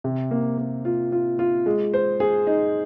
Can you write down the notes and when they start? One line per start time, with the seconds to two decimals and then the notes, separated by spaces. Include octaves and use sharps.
0.04 C3
0.31 A#3
0.58 A#3
0.85 F4
1.12 F4
1.39 F4
1.66 G#3
1.94 C5
2.20 G#4
2.47 D#4